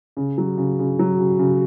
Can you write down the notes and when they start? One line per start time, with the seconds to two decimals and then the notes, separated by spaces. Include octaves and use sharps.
0.17 C#3
0.38 F#3
0.58 C#3
0.79 C#3
0.99 F#3
1.19 C#3
1.39 C#3